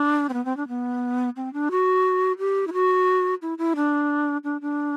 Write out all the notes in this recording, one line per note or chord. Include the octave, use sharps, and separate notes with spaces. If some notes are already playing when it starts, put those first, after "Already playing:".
Already playing: D4
C4
B3
C4
D4
B3
C4
D4
F#4
G4
E4
F#4
E4
E4
D4
D4
D4